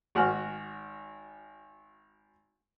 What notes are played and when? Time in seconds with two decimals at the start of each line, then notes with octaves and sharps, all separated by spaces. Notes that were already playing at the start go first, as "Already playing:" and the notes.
0.15 G#1 F#4 F#5 G#5 F6